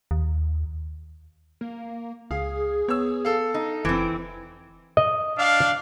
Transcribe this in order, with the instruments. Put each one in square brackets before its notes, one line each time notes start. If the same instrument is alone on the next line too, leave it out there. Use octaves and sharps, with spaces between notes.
[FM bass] D#2
[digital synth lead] A#3
[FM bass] C#2 [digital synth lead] G#4 [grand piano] F5
[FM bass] B3 [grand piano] C#5 E6
[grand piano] A4 F5
[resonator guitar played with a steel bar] D#4
[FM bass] F1 [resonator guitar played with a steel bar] E3 C4 [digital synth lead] D7
[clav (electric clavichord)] D#5
[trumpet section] D4 F5